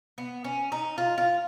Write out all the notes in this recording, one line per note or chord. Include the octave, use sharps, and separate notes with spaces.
B3
C#4
D#4
F4
F4